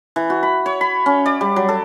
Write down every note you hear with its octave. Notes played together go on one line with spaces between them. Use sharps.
E3
F#4
B5
C#5
B5
C#4
D5
G3
F#3
A4